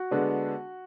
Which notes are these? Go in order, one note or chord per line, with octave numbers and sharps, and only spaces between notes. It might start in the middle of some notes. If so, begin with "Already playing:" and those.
Already playing: F#4
D3 G#3 B3 D4